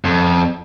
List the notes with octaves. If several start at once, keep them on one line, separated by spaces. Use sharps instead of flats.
F2